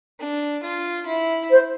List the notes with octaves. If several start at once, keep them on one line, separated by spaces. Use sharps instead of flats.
D4
F4
E4
C5